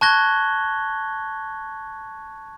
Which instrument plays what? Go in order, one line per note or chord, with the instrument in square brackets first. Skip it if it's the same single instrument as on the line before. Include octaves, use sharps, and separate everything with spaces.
[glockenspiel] A5 C#6 F#6 G#6 A#6 G7